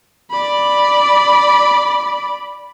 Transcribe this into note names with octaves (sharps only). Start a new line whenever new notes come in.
D5 B5